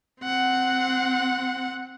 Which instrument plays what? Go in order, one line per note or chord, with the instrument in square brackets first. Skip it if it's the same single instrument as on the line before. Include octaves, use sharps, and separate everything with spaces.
[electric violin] C4 F#5